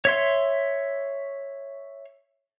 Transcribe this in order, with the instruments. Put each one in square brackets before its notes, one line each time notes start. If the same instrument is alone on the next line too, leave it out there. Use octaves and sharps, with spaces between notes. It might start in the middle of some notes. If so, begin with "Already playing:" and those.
[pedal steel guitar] C#5 E5 C6